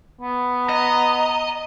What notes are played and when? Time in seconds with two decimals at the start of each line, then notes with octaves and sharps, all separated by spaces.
0.21 B3
0.69 D#5 A#5